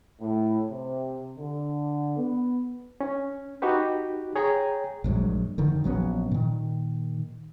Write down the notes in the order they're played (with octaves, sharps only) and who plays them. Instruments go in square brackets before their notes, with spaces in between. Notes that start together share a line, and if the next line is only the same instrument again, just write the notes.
[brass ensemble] A2
C3
D3
B3
[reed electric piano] C#4
D#4 F#4 G4 B4
G#4 C#5 G5 G#5 A#5
[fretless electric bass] A#1 G2 F#3 G#3
F1 D3 D#3
A#1 F#3 B3 C#4
A#2 D#3